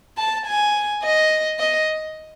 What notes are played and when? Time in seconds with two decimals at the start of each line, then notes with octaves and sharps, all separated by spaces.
0.18 A5
0.46 G#5
1.03 D#5
1.59 D#5